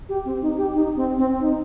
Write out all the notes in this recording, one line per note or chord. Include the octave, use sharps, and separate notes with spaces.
G4
C4
D#4
G4
D#4
C4
C4
D#4